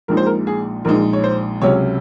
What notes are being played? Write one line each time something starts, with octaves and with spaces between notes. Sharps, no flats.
A#1 A#2 G#3 D#4 A#4
C5
A#4
G#4
A#1 A#2 G#3 D#4 A#4
C#5
C5
C#2 C3 F#3 C#4 C#5